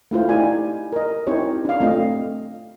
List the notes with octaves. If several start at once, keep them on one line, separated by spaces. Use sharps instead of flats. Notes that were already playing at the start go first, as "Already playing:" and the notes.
A3 E4 F4 C5
D#4 E4 G4 D5 G#5
A#4 D#5
C4 D#4 E4 G4 C5 C#5
D4 F5
A3 C4 F4 D#5